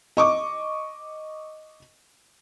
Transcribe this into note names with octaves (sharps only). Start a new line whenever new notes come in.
D#5 C#6 D6